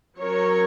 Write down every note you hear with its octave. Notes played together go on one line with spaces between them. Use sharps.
F#3 C#4 A#4 C#5